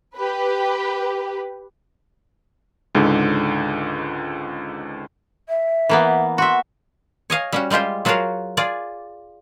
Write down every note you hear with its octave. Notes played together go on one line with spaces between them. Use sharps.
G4 B4
C#2 G#2 D3
E5
E3 A#3 B3
F#4 E5 C6
C#5 D#5 F5 G#5
G3 C#4 F#4
G3 G#3 F4 G4 C5
F#3 F4 F#4 G#4 A#4 F5
F4 G#4 D5